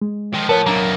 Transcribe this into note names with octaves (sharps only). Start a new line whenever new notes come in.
G#3
D#3 F3
A2 F3 B3 A#4 C#5 A5
B2 F#3 A#3 D4 A#5